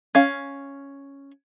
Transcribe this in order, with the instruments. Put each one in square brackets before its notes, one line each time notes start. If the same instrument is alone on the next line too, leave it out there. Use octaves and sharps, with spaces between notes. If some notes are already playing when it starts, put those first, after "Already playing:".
[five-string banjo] C#4 F5